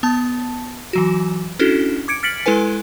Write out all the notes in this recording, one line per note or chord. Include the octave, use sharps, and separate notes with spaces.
B3 A5
E3 F#3 F#4
C#4 D4 E4 F#4 A4
D6 G#6 C#7 D7
F6 A6 B6 C#7 D7 F#7
G#3 E4 A4 B4 G#5